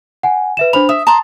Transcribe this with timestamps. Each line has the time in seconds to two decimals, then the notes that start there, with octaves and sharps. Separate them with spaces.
0.23 F#5 G#5
0.57 B4 E5 E7
0.73 D4 C5 B5 F7
0.89 E5 D#6
1.07 A5 A#5 C6